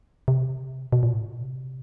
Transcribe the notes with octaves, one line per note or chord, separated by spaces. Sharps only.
C3
B2
A#2
A2
A#2
C3